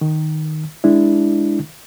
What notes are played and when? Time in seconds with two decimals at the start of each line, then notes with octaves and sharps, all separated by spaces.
0.01 D#3
0.84 G#3 D4 E4